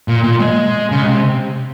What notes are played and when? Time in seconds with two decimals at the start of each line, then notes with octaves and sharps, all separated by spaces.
0.08 A#2
0.24 A#2
0.40 G#3
0.91 C#3
1.03 C3